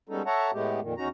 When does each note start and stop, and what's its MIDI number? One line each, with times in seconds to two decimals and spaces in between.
0.09 0.22 55
0.09 0.22 56
0.09 0.22 59
0.09 0.22 61
0.09 0.22 63
0.09 0.22 69
0.26 0.51 69
0.26 0.51 73
0.26 0.51 76
0.26 0.51 78
0.26 0.51 81
0.26 0.51 82
0.53 0.80 45
0.53 0.80 56
0.53 0.80 57
0.53 0.80 59
0.53 0.80 67
0.81 0.94 41
0.81 0.94 46
0.81 0.94 51
0.98 1.08 40
0.98 1.08 61
0.98 1.08 63
0.98 1.08 66
0.98 1.08 82